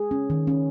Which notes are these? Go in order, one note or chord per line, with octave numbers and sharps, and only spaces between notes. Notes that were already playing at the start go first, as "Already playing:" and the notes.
Already playing: G#4
C#4
D#3
C#4